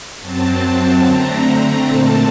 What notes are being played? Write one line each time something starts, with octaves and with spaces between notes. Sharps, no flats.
F#2 F#3 C4 A5
D3 A3 C4 A#5
A#2 A3 C4 A5